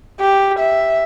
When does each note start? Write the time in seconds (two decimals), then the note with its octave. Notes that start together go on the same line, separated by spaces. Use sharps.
0.20 G4
0.59 E5